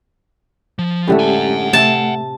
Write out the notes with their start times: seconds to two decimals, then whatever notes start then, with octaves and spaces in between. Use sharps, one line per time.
0.79 F3
1.08 A2 D3 G#3 A3 C#4 G4
1.19 F#5 G#5
1.73 C3 A3 E5 A5